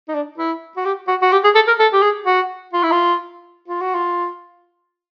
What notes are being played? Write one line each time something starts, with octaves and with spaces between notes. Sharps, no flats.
D#4
D4
E4
F#4
G4
F#4
F#4
G4
G#4
A4
A#4
A4
G4
G#4
F#4
F4
E4
F4
F4
F#4
F4